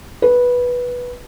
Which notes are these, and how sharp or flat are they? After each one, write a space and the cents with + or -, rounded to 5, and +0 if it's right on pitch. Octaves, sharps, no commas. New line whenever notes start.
B4 -10